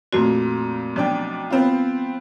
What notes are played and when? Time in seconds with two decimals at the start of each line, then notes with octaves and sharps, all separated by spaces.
0.13 F2 A#2 A3 C4 F#4
0.96 B1 F3 D4 G5
1.50 B3 C4 F4